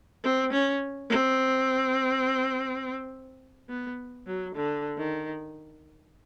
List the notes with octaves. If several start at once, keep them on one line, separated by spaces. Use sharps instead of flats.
C4
C#4
C4
B3
F#3
D3
D#3